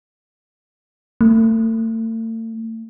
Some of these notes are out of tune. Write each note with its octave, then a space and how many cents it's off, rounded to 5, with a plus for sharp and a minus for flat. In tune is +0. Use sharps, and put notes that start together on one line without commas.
A3 +40